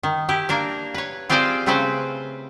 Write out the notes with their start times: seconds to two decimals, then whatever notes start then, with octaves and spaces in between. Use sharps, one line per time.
0.03 D#3
0.29 E4 G4
0.49 A#3 D4 A#4
0.94 B4 C#5
1.30 C4 F4 G4 G#4 C5 D5
1.66 C#3 A3 C4 C#4 B4 C5